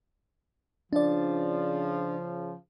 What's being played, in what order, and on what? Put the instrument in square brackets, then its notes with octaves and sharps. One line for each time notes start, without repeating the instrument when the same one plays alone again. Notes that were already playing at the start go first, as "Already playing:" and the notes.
[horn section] C#3 F3 [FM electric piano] D4 D5